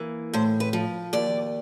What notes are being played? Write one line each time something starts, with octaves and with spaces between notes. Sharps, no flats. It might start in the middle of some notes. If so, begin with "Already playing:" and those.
Already playing: E3 A#3
A2 C5
B4
F3
D#2 D5